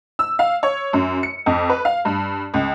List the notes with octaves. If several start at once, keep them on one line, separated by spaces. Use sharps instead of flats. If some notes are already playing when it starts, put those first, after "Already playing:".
E6
F5
C#5
F#2
C#7
F2
B4
F5
G2
C#2